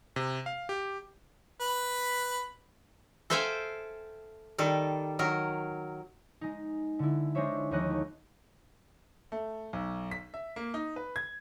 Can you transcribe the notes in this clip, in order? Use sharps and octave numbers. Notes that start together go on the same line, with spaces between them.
C3
F5
G4
B4 B5
A4 C5 E5 F5 G5 G#5
D#3 G3 A4
D#3 F#3 A#4
G#3 D#4
D3 E4
G#3 D4 D#4 C5 C#5 E5
D#2 F3 D#4 C#5 D#5 F#6
A3
A3
B1
B6
E5
A#3
D#4
B4
G#6